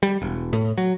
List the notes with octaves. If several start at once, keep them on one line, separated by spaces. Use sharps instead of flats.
G3
E1
A2
F#3